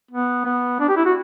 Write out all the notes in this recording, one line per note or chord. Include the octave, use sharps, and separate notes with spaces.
B3
B3
D4
G4
E4
F#4